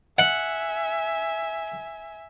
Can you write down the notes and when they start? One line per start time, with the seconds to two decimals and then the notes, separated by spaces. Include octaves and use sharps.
0.19 E5 F#5 G#5